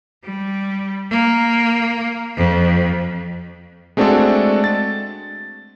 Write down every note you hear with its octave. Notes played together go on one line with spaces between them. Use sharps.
G3
A#3
F2
G#3 A3 C4 D4 F#4 A4
A6